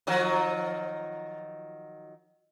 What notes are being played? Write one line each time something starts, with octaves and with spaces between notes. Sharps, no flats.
D#3 F3 F#3